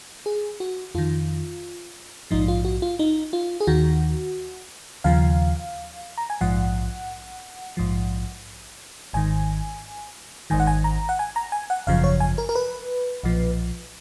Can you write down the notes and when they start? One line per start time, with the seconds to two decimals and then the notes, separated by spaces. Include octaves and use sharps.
0.26 G#4
0.60 F#4
0.95 F2 D#3 F4
2.31 A#1 G#2 F3 D#4
2.48 F4
2.65 F#4
2.82 F4
2.99 D#4
3.33 F4
3.60 G#4
3.67 D#2 D#3 F#4
5.04 D#2 C#3 F3 F5
6.18 A#5
6.30 G#5
6.41 A#1 G#2 F3 F#5
7.77 A#1 G#2 F3
9.13 G#1 G#2 D#3 G#5
10.50 G#1 G#2 D#3 G#5
10.60 F#5
10.67 G#5
10.84 A#5
11.09 F#5
11.19 G#5
11.36 A#5
11.52 G#5
11.70 F#5
11.87 G#1 F#2 C#3 F3 F5
12.04 C#5
12.20 G#5
12.38 A#4
12.49 A#4
12.55 B4
13.23 B1 A#2 F3